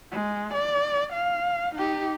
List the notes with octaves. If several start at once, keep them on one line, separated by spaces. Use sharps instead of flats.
G#3
D5
F5
D#4 G4